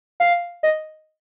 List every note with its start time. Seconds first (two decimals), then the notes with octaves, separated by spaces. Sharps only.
0.20 F5
0.63 D#5